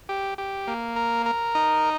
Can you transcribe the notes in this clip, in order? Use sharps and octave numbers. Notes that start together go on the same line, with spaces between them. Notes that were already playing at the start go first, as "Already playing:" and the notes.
G4
G4
A#3
A#4
A#4
D#4